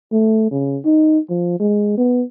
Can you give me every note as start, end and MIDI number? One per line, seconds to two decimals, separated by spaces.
0.12 0.49 57
0.51 0.78 49
0.85 1.19 63
1.30 1.56 53
1.60 1.94 56
1.97 2.23 59